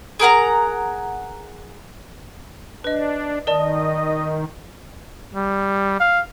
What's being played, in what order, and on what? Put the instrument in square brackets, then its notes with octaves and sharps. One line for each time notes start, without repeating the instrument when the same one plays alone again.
[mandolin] G#4 A#4 F#5 A#5
[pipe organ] D4 [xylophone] B4 D#5
[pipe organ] D#3 [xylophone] A#4 D5 A5 [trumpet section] D#5
[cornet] G3
F5